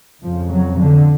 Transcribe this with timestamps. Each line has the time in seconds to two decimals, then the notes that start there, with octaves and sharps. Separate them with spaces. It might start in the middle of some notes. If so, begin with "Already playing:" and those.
0.22 F2 C#3 F3
0.51 F#3
0.79 D3